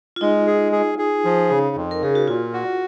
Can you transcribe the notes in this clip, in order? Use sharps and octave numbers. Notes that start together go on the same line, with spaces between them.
F4
G#3 D#4
G#4
G#4
G#4
F3
C#3
F2
A#4
C#3 G#4
F#4
A#2 F4
F#4